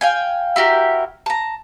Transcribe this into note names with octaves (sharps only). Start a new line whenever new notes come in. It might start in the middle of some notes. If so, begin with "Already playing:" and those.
F5 G5 G#5
E4 F#4 G4 A#4
A5 A#5